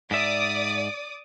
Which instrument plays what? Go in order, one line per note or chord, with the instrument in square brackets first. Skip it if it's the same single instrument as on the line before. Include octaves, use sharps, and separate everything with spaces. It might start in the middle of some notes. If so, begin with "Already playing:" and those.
[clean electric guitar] G#2 E5 [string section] D5 D6 D#6